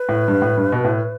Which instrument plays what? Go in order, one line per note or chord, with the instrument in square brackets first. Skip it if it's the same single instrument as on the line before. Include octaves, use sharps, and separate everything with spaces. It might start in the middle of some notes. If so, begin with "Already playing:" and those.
Already playing: [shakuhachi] B4
[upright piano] A2
G2
A2
G2
B2
A2